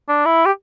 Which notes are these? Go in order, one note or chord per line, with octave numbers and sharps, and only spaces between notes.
D4
E4
G4